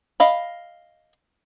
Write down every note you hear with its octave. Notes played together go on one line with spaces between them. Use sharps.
D#5 F5 B5